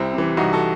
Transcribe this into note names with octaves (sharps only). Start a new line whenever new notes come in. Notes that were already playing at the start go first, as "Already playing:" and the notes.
Already playing: C2 C4 E4
C3 E3
C2 D#4 F#4
F#4 A4